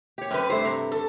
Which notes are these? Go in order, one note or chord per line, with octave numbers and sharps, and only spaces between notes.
G4 C#5
F#2 C4 G4 B4
G2 A3 D4 C5
C3
A4